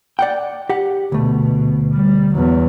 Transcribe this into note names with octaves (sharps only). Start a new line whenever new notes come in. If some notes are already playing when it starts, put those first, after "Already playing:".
D5 F#5 G5
G4 F#5
D2 B2 A3
G3
E2 F#3